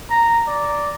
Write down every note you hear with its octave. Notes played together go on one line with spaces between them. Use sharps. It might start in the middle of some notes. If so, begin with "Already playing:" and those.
A#5
D5